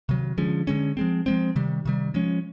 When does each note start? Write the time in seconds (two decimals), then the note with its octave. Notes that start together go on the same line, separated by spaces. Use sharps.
0.09 C3 D#3 F#3
0.38 D3 F3 G#3 C#4
0.67 D3 F3 G#3 C#4
0.97 F3 G#3 C4
1.26 F3 G#3 C4
1.56 C3 D#3 G3
1.85 C3 D#3 G3
2.14 F3 G#3 C#4